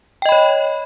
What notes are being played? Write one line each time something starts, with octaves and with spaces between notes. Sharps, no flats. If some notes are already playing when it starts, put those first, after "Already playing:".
C#5 D#5 G5 B5